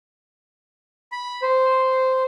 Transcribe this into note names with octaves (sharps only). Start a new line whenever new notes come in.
B5
C5